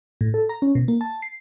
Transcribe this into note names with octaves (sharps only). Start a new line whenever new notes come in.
A2
A4
A#5
C#4
B2
A#3
A5
C7